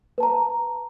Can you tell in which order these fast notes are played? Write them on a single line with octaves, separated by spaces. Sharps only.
B4 A5 A#5